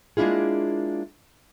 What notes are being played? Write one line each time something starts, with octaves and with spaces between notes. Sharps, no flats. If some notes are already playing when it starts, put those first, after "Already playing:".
G#3 A#3 D4 E4 F4 G#4